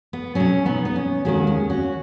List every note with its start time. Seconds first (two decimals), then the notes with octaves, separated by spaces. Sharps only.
0.13 B3
0.35 B2 F#3 C#4
0.65 B3 D#4
0.85 B3
0.96 C#4
1.25 D#2 D#3 G#3 C#4 F#4
1.47 C#4
1.70 C#4 F#4